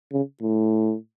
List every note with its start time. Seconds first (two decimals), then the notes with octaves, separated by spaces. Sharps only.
0.12 C#3
0.42 A2